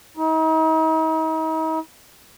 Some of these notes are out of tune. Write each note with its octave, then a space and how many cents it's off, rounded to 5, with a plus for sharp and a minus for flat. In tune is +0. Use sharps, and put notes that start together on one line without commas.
D#4 +40